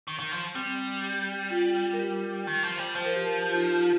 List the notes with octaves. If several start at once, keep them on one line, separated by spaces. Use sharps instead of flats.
D#3
D#3
F3
G3 C4
F4
A#4
G4
D#3
F3
G3
F3 C5
A#4
G4
A#4
G4
F4
D#4
F4
F4